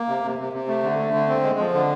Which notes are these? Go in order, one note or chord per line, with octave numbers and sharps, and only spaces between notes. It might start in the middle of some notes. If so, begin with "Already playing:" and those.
Already playing: A#3
C3
C3
C3
C3
A3
D3
A3
D3
C4
G#3
F3
D3